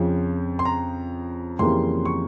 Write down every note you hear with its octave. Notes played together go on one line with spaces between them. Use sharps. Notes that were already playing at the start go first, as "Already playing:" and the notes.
Already playing: F2 C#3 F3
C6
A#5
F2 C#3 E3 G3 A#3 C6
C#6